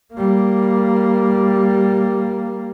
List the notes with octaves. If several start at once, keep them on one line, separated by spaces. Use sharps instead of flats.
G3 A#3